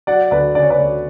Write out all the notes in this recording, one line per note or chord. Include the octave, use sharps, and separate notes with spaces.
F#3 D5 F#5
D2 B4 D5
C#3 D5
C#5
B4 D5
D2